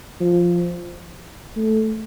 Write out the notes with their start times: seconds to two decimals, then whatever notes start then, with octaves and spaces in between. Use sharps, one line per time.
0.20 F3
1.56 A3